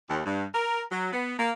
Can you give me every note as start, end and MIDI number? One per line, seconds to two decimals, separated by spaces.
0.09 0.24 39
0.26 0.46 43
0.54 0.83 70
0.91 1.11 54
1.13 1.35 59
1.39 1.52 58